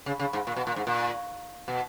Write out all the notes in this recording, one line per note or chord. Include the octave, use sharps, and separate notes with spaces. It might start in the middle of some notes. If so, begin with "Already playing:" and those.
C#3
C#3
G#2
A#2
B2
A#2
G#2
A#2
B2